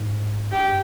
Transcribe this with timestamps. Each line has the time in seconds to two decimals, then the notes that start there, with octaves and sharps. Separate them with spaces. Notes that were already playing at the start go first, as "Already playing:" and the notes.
Already playing: G#2
0.51 G2 G4